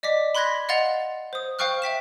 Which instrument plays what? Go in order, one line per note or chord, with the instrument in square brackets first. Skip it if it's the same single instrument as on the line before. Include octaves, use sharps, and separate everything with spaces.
[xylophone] D5 D#5 D6 B6
B5 C6 F#6 G#6 A#6 B6
D#5 F5 F#5 C6 A6 F7
C5 D#6
C5 F5 G5 C#6 F6 F#6
E5 G5 B6 E7